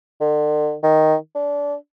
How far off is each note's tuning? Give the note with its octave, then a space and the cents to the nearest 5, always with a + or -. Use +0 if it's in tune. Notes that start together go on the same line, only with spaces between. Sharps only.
D3 +40
D#3 +5
D4 -25